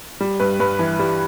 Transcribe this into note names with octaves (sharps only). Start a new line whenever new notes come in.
G3
G2 B4
G2 B4
E3
G3